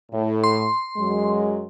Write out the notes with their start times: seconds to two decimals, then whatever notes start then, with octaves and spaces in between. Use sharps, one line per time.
0.12 A2
0.44 C6
0.97 F#2 F#3 G#3